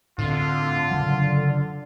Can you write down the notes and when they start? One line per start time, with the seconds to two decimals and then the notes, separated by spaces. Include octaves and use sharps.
0.18 A2 D3 C4 F4
0.91 C#3 F#3